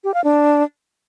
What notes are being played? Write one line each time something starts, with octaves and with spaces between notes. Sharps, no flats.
G4
F5
D4